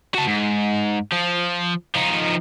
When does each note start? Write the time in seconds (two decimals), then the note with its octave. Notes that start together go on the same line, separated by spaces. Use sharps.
0.15 F#4 A5
0.27 G#2
1.12 F3
1.95 F3 D#4